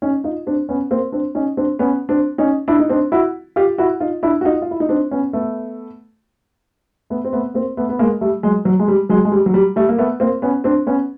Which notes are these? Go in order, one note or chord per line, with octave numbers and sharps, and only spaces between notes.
C#4 D#4
D#4 F4
C4 D4
B3 C#4
A#3 C4
C4 D4
C#4 D#4
C4 D4
B3 C#4
C4 D4
C#4 D#4
D4 E4
D#4
C4 D4
E4 F#4
F4 G4
E4 F#4
D#4 F4
D4 E4
F#4
D#4 F4
F4
E4
D#4
C4 D4
B3 C#4
A3 B3
A3 B3
C4
A3 B3
A#3 C4
A3 B3
B3
G#3 A#3
G3 A3
F#3 G#3
F#3
G#3
G3
F#3 G#3
G#3
G3
F#3
G3
G3 A3
A#3
A3 B3
A#3 C4
B3 C#4
C4 D4
B3 C#4